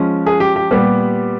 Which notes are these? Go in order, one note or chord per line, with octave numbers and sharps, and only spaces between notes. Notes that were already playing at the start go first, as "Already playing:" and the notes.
Already playing: F3 G#3 C#4
G#4
G4
G4
A#2 G3 B3 G4